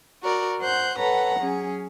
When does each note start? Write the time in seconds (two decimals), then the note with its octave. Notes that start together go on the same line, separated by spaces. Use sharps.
0.22 F#4 A#4 D5
0.61 C5 F#5 F#6 G6
0.99 A4 B4 C#5 F#5 A#5
1.41 F#3 C#4 G#4